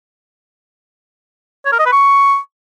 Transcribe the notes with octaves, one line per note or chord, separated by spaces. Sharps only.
C#5
A#4
D#5
B4
C#6